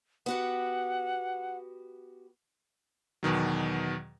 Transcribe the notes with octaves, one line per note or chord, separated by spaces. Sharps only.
B3 F#4 G4 F#5
E2 B2 D#3 F#3